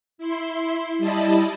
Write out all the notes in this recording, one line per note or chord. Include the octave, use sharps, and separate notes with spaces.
E4 C6
G3 E4 D#5 A5 B5 B6